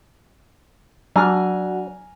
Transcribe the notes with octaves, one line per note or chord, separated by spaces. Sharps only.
F#3 D4 F#4 F#5 G#5 A#5 F6